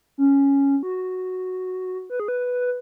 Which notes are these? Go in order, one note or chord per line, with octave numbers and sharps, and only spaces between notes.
C#4
F#4
B4
G#4
B4